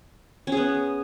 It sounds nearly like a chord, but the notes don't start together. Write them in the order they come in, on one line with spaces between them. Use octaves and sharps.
C#4 G#4 B3